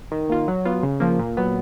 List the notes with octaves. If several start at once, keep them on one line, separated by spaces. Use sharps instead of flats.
D#3
A#3 F4
F#3
B3 F4
C#3
F3 A#3
A#2
F#3 B3